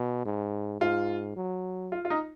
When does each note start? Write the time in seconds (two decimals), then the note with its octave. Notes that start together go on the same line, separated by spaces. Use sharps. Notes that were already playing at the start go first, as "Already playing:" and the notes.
Already playing: B2
0.25 G#2
0.80 G#2 F4
1.36 F#3
1.92 F4
2.05 F4
2.10 D#4